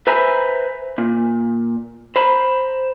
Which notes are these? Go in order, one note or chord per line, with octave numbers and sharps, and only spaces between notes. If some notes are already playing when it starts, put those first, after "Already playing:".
B4 C5 E5 G#5 A#5 B5
A#2
C5 A#5 B5